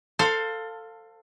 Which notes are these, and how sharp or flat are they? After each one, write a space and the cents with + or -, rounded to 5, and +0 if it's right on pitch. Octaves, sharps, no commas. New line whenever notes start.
A4 +20 C5 +0 F5 +10